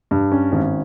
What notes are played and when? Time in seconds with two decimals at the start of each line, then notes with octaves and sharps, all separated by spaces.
0.11 G2
0.32 C#4
0.52 G#1